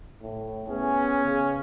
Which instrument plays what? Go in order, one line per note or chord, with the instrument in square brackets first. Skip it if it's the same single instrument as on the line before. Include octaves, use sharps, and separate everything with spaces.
[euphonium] A2
[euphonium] B3 [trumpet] C#4 [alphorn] G#4
[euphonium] C#3